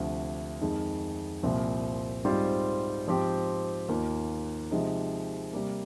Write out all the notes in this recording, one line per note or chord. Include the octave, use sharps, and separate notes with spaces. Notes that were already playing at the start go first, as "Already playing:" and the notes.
Already playing: D2 C3 F3
F2 D#3 G#3
C2 A#2 F3 C4
G#2 G3 C4 F4 C5
G#2 F3 C4 G4
D#2 D#3 A#3 F4
C3 F3 G#3 D#4
C3 G3 A#3